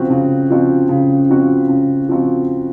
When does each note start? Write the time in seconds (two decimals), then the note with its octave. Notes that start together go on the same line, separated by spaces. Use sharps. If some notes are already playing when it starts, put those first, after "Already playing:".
Already playing: C#3 F3 C4 F#4
0.10 C#3
0.50 F3 C4 F#4
0.89 C#3
1.29 F3 C4 F#4
1.69 C#3
2.09 F3 C4 F#4